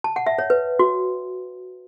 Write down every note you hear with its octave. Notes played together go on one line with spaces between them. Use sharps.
A5
F#5
E5
C#5
B4
F#4